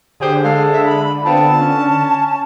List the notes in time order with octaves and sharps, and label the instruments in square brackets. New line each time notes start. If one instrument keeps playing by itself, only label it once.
[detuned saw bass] D3 [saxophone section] G4 G#4 C5
[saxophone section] G#3 A4 [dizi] F5
[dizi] E5
B5
[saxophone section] B3 C4 F4 [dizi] A5
[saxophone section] C#4